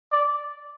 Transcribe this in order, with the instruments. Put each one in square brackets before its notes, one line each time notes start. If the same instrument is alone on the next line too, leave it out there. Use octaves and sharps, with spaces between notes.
[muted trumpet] D5